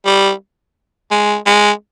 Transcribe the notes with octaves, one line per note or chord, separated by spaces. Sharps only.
G3
G#3
G#3